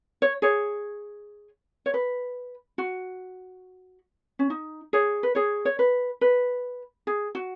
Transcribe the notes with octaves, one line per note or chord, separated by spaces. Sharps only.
C#5
G#4 C#5
C#5
B4
F#4
C#4
D#4
G#4 C#5
B4
G#4 C#5
C#5
B4
B4
G#4
F#4